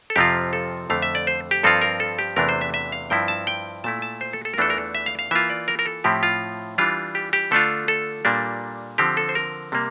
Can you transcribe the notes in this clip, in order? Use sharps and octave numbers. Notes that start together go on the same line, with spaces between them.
A4
F2 C3 F3 C4 F4 G4
A4
F2 D3 A3 F5
E5
D5
C5
G4
G2 F3 C4 F4 A4
A#4
A4
G4
E2 C3 E3 A3 D4 A#4
C5
E5
E5
F5
G2 F3 C4 E4 G5
A5
G5
A#2 A3 E4 A5
A5
C5
A4
A4
A#4
E2 E3 A3 D4 F4 A4
A#4
A4
E5
F5
F5
E3 A#3 F4 E5
D5
A#4
A#4
A4
A2 F3 C4 E4 G4
F4
E3 G3 D4 F4
G4
G4
D3 A3 D4 F4 A4
A4
A#2 G3 A#3 D4
D3 F3 C4 G4
A4
C5
A#4
C3 G3 A#3